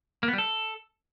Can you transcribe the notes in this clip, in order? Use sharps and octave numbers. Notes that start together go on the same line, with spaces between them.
A#3
B3
G3
A4